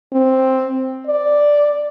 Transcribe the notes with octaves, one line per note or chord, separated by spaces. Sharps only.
C4
D5